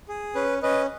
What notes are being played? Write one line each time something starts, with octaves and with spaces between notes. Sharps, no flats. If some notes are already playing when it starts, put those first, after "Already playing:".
G#4
C#4 B4
C#4 B4 D#5